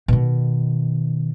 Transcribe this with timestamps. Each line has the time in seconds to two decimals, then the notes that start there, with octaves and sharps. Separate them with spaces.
0.08 B2 D#3